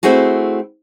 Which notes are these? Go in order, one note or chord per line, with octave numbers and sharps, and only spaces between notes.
A3 C4 E4 F#4 G#4